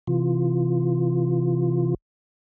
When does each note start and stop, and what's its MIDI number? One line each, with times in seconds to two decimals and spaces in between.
0.07 1.94 48
0.07 1.94 52
0.07 1.94 65